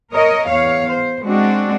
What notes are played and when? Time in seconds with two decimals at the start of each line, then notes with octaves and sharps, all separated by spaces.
0.13 A#4 C#5 D#5
0.49 E2 C#5 F5
0.92 C5
1.25 G#3 C4 D4 F#4